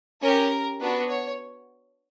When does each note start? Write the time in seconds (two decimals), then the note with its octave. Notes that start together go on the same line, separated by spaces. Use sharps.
0.21 C#4 G4 A#4
0.80 B3 D4 F#4 B4
1.08 C#5